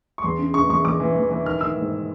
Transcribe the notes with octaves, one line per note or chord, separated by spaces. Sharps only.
C#6
E2 C6
C#3
C#3 C#6
E2 C#6
E2 D6
E3
E3
E3
D#3 F6
D#3 E6
G#2